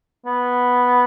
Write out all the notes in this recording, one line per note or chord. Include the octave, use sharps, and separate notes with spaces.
B3